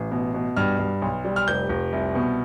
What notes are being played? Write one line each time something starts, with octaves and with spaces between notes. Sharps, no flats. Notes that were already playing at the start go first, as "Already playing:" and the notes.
Already playing: A1
B2
B2
G2 F6
G2
B1
G3
F6
F1 G6
F1
C2
B2